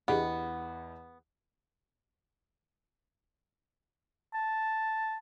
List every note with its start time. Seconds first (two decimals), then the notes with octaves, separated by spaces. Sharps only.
0.08 E2 B3 D4 G4 G#4 D#5 F#5
4.34 A5